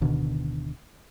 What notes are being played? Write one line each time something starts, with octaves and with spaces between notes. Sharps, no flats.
D1 B2 D3 D#3